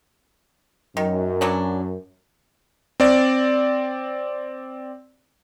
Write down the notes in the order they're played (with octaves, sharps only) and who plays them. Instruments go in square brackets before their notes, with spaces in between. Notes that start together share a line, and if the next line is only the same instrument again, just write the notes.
[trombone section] F#2 [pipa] D#3
[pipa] E3 F#3 D4
[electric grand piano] C4 D5